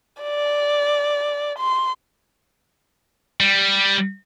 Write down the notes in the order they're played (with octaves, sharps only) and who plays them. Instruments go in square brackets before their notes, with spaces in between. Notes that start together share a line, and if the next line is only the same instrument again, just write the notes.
[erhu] D5
C6
[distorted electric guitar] G3